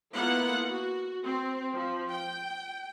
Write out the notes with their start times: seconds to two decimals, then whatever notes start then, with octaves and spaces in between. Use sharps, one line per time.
0.14 A#3 B3 E4 F4 A4 F#5
0.70 F#4
1.22 C4
1.72 F3
2.09 G5